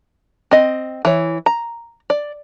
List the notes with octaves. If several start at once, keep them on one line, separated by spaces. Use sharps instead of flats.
C4 D#5
E3 C#5
A#5
D5